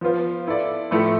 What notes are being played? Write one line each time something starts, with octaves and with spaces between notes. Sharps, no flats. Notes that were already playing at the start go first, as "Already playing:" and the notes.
F3 B3 F4 C5
B3 E4 A4 D5
A2 F3 A3 E4 A4